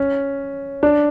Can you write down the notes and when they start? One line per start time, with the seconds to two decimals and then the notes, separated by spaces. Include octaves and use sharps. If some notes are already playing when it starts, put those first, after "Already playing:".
Already playing: C#4
0.83 D4